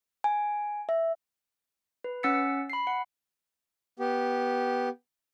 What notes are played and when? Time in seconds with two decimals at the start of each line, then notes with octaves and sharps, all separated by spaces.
0.24 G#5
0.89 E5
2.04 B4
2.23 C#4 F#5 E6 A6 B6 C#7
2.70 B5 C7
2.87 F#5
3.99 B3 G4